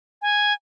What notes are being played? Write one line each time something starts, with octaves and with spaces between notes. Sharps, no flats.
G#5